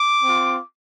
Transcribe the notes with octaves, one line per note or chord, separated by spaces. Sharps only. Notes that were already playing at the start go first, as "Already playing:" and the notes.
Already playing: D6
C4 F4